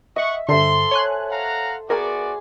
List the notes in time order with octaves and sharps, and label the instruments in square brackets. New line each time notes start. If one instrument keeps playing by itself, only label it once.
[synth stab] D#5 [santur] E5 [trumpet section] F#5 C#6
[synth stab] G2 D3 [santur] A4 C5 E5 [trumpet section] C6
[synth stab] C#5 G#5 F#6
[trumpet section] F5 F#5 A#5
[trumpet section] B3 F#4 D5 [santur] G#4 G#5 D6 [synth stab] A#4